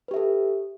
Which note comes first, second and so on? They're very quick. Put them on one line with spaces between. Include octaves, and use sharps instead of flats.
B4 G4 E5 A4